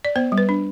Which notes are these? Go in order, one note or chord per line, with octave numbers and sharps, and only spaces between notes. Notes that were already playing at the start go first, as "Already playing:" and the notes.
D5
B3 C5
G3
B4
D4